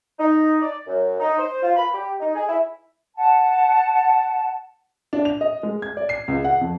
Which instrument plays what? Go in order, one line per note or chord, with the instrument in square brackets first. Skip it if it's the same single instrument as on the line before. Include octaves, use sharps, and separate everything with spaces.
[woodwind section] D#4
D5
F#2
D#4
C5
F4
B5
G4
D#4
G#4
E4
[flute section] F#5 A5
[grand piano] D4
F7
D#5
G#3
G#6
D5
C7
C#2
F#5
F2